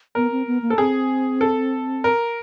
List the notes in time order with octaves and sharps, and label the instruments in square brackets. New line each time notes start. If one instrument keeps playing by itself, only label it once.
[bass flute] B3 [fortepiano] A#4
[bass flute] C4
B3
A#3
[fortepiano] A4
[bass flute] C4 [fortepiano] G#4
[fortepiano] A4
A#4